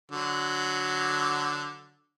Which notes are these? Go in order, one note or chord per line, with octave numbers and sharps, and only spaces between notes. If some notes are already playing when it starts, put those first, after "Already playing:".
D3 F#3